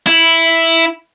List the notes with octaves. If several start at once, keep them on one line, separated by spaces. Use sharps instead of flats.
E4